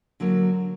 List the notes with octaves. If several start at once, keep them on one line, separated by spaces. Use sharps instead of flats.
D3 F#3 A#3